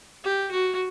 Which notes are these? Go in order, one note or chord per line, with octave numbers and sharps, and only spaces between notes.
G4
F#4